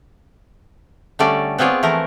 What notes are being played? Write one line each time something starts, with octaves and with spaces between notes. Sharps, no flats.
D3 G3 A3 C#4 D5
B3 C4 F4 G#4 C#5 D5
E3 F3 A3 A#4